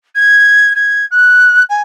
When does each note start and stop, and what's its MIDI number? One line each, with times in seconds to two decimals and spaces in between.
0.15 0.73 92
0.75 1.06 92
1.11 1.63 90
1.69 1.82 80